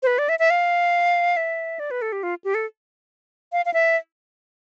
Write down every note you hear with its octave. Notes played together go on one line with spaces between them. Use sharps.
C5
B4
D5
E5
E5
F5
E5
D5
B4
A4
G4
F4
G4
A4
F5
F5
E5